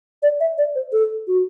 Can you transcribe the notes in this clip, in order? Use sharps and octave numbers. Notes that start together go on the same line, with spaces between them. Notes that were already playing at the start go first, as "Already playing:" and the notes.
D5
E5
D5
C5
A4
F#4